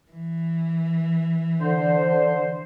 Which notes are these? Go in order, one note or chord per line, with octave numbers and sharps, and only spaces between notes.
E3
D3 C5